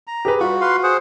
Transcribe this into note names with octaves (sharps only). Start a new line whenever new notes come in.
A#5
G4 G#4 B4
G3 F4 F#4
B4 F5 C6
G#4 C5 F#5